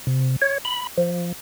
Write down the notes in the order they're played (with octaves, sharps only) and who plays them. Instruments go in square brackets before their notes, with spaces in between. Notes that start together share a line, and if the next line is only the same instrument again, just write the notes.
[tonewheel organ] C3
C#5
B5
F3